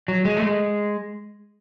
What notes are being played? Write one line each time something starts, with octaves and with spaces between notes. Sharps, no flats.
F#3
G#3
A3
G#3